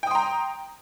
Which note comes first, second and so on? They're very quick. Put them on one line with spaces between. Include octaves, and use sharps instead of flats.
G5 D#6 C6 A#5